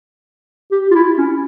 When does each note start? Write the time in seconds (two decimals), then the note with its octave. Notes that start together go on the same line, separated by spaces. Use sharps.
0.72 G4
0.91 F4
0.95 E4
1.18 C#4